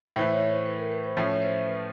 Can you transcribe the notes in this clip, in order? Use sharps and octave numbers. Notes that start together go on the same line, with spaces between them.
A2 E3 A3 C5
C#5
C5
B4
A#4
B4
C5
A2 F3 A3 C#4 C#5
C5
B4